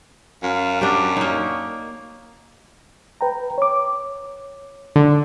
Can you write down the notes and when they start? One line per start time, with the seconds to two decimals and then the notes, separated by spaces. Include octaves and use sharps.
0.43 F#2 F5
0.81 D4 F#4 G4
1.17 A#3 D#4 C#5
3.21 B4 G5 A#5
3.58 C#5 D6
4.96 D3